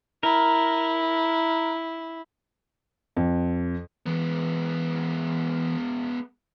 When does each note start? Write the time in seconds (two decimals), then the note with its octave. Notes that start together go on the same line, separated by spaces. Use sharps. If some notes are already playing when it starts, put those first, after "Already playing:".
0.23 E4 A#4
3.17 F2
4.06 E3 G#3 B3